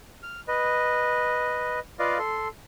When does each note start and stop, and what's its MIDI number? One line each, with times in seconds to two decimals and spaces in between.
0.23 0.40 89
0.48 1.79 71
0.48 1.79 75
1.99 2.18 65
1.99 2.18 71
1.99 2.18 74
1.99 2.18 75
1.99 2.18 77
2.19 2.48 69
2.19 2.48 84